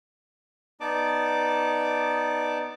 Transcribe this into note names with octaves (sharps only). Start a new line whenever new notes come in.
B3 D#4 D5 A5 D6